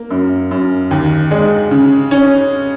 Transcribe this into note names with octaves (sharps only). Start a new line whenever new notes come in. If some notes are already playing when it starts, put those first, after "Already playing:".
Already playing: A#3
F#2
F#2
D#2
G#3
C#3
C#4